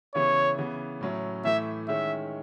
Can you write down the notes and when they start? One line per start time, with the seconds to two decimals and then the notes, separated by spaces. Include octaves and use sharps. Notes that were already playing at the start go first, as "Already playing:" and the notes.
0.15 C#3 E3 B3 E4 C#5
0.58 C#3 E3 B3
1.01 A2 F#3 C#4 E4
1.45 A2 E3 A3 E4 E5
1.88 D#3 G#3 C#4 E4 E5